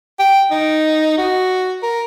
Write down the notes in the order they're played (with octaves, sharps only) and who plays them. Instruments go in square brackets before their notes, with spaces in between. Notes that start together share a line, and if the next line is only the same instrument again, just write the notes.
[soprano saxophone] G5
D#4
F#4
A#4